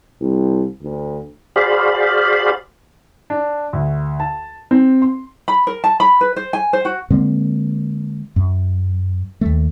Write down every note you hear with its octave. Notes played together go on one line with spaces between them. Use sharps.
C2
D2
F#4 G#4 C5 D5 F5 B5
D4
D2
A5
C4
C6
B5
A#4
A5
B5
B4
C5
G#5
C5
F#4
D3 G#3 A#3 C4
F#2
D#2 A3